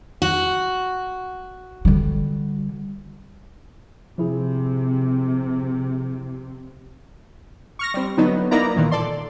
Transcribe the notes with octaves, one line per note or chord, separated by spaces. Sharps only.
F#4
D3 G3
C3 F3 E4 G#4
C#6 F6 A#6
G3 C4
D3 F#3 B3 D#4
A#3 B3 D#4 E4 D5 A#5
A#2 D#3 E3
A4 D5 C6